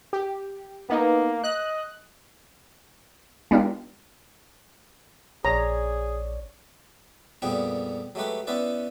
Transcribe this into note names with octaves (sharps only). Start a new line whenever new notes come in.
G4
A#3 B3 D#4
D#5 F#6
G#3 B3 D4 D#4 F4 G4
A#1 G#4 C#5 D5 A#5
F2 A#2 G3 B3 G#4 G5
F#3 G#3 A3 G4 B4
B3 C#4 E4 B4 C5 D5